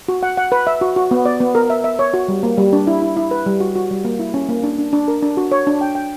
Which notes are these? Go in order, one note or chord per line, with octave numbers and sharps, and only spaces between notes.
F#4
F#5
F#5
B4
E5
F#4
F#4
B3
D5
B3
A#4
E5
E5
C#5
F#4
G3
A#3
G3
D4
E4
E4
E4
B4
G3
F#4
F#4
G3
A#3
E4
C#4
A#3
D4
D4
D4
A#4
D4
F#4
C#5
D4
G5
G5